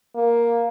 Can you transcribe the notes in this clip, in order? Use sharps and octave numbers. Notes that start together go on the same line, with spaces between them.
A#3